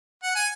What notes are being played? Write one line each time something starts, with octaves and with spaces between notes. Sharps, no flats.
F#5
G#5